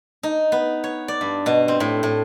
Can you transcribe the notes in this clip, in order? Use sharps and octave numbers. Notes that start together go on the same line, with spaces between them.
D#4
B3
C#5
D5
G2
B2
C4
A2
A2